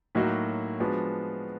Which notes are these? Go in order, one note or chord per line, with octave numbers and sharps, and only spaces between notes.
A2 F#3 A#3 D#4 F#4
F3 G#3 B3 D4 F#4